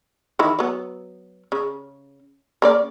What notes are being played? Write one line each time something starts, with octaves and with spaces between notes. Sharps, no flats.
D#3 E3 E4
F#3 B3
C#3
C#3 A#3 D5